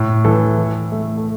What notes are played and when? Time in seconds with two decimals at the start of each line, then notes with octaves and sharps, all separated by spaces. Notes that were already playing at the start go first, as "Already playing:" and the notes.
Already playing: A2
0.25 E3 A4
0.58 E3
0.92 A3
1.17 A4